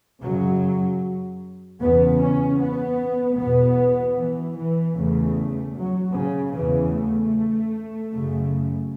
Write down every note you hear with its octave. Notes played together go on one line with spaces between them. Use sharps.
F#2 C#3 F#3
E2 C#3 B3
C#4
B3
E2 B2 B3
E3
E3
E2 C#3 A3
F#3
C#3
E2 C#3 E3
A3
F#2 C#3